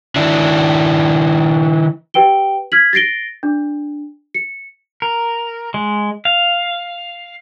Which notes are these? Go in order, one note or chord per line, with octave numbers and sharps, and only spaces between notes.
D#3 D4 E4
G4 B4 G5 D7 G7
F6 G#6 B6 F#7
A6 A#6 C7 D7 G7
D4
C#7
A#4
G#3
F5